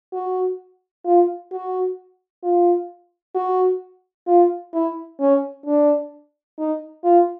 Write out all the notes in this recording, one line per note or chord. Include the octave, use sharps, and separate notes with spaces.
F#4
F4
F#4
F4
F#4
F4
E4
C#4
D4
D#4
F4